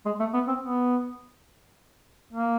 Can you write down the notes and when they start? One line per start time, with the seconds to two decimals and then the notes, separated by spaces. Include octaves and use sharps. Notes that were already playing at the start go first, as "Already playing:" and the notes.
0.06 G#3
0.20 A3
0.34 B3
0.48 C4
0.62 B3
2.33 A#3